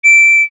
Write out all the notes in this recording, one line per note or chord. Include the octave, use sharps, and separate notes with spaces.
D7